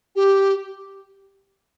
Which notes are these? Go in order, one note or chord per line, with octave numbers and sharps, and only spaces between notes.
G4